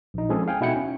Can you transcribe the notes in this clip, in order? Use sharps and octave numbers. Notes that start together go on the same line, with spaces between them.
A#1 D#4
F3 G#3 C4 C#4 G#4 A4
F5 G5 G#5
B2 D#4 E4 F#5 G5 C#7
C#4